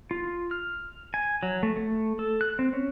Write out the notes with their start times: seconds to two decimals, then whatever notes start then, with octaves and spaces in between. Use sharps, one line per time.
0.11 F4
0.51 F6
1.14 G#5
1.43 F#3
1.63 A3
1.77 A3
2.19 A4
2.41 F#6
2.59 C4
2.73 C#4